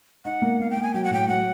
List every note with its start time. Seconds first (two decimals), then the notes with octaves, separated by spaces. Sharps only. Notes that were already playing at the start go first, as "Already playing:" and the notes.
0.25 D#4 F#5
0.42 A#3
0.59 A#3 F5
0.71 G5
0.76 A#3
0.83 G#5
0.94 F#3 G5
1.04 F#5
1.10 A2 G5
1.28 F#3 F#5